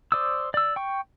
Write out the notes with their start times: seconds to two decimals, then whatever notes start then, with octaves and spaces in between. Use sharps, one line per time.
0.12 C5 D5 D#6 E6
0.54 D5 E6
0.76 G5 C#6